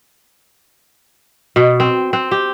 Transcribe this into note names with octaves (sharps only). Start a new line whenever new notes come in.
B2
C4
C4
G4